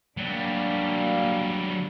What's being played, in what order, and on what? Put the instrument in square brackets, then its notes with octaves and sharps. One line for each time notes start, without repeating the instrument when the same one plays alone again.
[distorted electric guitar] F#3 G3 [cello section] A#3 D4